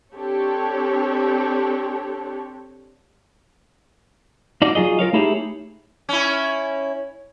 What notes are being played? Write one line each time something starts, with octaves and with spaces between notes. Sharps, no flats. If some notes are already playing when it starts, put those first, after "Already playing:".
C4 D4 G4 A4 C#5
D#4 F#4 D5
F#3 F4 G#4 D#5
F4 A#4 C#5 F5
A3 D#4 E4 G4 G#4 C#5
C#4 E4